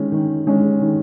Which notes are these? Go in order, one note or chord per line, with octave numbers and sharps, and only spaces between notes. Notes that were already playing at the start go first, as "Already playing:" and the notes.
Already playing: D#3 G#3 C#4
D#3
G#3 C#4
D#3